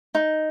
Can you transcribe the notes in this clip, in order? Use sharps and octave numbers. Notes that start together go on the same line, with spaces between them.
D#4